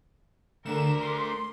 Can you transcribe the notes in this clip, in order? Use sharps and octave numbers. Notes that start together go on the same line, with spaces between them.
D3 A3 D4 A#4 D6 E7
C6